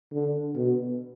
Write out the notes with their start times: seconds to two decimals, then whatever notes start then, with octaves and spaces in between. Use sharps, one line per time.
0.13 D3
0.56 B2